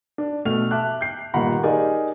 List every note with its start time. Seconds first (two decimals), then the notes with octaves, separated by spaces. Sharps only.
0.18 D4
0.45 B2 A3 F6 F7
0.71 E5 A5 D6 F#6
1.01 G6 C7
1.34 G2 A#2 D#3 F#5 A#5 B5
1.63 D#4 G4 G#4 A#4 D5 G#5